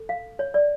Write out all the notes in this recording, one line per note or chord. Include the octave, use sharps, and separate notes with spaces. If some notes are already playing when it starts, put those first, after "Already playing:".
Already playing: A4
F5
C#5
D5